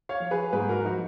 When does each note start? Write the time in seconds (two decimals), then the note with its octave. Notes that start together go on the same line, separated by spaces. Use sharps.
0.09 C#5 F5
0.20 F3
0.31 G#4 B4
0.52 G#2 G#4 B4
0.69 F#4 A#4
0.85 F3 D#4 F#4